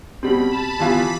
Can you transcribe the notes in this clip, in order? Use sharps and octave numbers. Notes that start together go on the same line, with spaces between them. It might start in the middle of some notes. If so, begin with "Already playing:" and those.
B2 G3 C4 B5
A5
G2 E3 B3 F4 B5